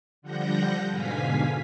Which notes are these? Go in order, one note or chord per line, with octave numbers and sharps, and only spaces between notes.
D3 F3 G3 F#5 G6 A#6
G#2 B2 D3 F5 G#5 B6